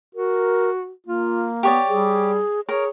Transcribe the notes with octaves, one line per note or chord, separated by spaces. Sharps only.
F#4 A#4
A#3 F4
B3 G4 C#5 D5
G3 G#4
G#4 A#4 C#5